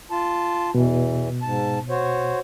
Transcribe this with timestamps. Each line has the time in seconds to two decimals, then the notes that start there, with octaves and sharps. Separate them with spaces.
0.11 F4 A5
0.75 E2 B2 E3
1.42 G#2 A5
1.89 F#4 C5 C#5